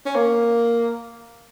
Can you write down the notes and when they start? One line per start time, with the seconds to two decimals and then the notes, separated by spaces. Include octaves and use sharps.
0.06 C#4
0.15 A#3